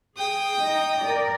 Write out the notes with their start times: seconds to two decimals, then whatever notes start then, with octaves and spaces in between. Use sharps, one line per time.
0.17 G#4 G5 D#6
0.59 D#4 D#5
1.02 A#4 D5